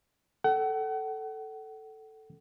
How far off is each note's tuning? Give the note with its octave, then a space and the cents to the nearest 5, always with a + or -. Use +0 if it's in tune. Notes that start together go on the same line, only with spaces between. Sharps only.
A4 +0 F#5 +40